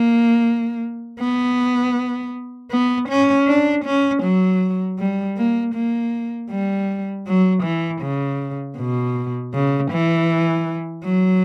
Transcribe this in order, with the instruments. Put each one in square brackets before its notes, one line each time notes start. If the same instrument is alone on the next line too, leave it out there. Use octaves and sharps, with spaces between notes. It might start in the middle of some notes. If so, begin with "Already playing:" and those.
Already playing: [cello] A#3
B3
B3
C#4
D4
C#4
F#3
G3
A#3
A#3
G3
F#3
E3
C#3
B2
C#3
E3
F#3